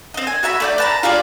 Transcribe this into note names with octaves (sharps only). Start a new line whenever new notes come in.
C4 D#5
G#5
F#4 E5 A#5 B5
A3 D5 G6
B4 A5 A#5
F4 G4 G#4 D5